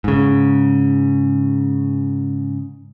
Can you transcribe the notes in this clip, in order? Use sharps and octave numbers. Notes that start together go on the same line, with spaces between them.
G#2 C#3